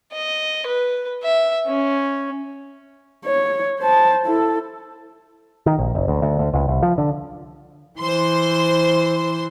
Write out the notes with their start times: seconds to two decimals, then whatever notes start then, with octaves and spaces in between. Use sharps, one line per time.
0.13 D#5
0.67 B4
1.23 E5
1.67 C#4
3.26 C#5
3.80 C5 A5
4.26 E4 A4
5.66 D#3
5.78 A#1
5.95 F#1
6.08 D2
6.22 D2
6.39 D2
6.53 C#2
6.68 C2
6.83 F3
6.98 D3
7.98 E3 C5 C6